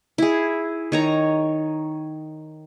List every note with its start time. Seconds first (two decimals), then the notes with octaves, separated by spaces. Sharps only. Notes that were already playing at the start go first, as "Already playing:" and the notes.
0.18 E4 G#4
0.92 D#3 C#5 A#5